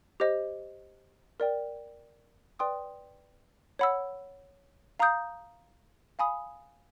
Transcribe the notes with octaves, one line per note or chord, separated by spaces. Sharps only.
G4 C5 D#5
A#4 D5 G5
B4 D5 G5 C6 D#6
C#5 F#5 B5 E6
F5 A#5 D#6 G6
F5 G#5 B5 D#6